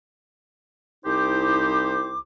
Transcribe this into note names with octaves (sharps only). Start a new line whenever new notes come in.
C2 D#4 E4 G4 C5 D6